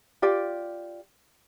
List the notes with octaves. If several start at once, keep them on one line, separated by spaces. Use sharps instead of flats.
F4 G4 D5